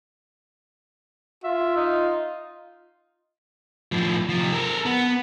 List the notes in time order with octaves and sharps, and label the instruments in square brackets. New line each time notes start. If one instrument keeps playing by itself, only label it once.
[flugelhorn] F4 [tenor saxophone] E5
[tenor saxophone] D#4
[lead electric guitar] A2 F3
C3 F3
A4 A#4
B3